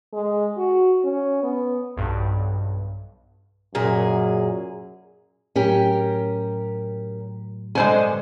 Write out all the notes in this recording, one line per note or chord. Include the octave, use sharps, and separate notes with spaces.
G#3
F#4
C#4
B3
B1 G2
F#2 A#2 G#4
A2 F#3 C#4 G4 A#4
G2 D3 G#3 C5 G#5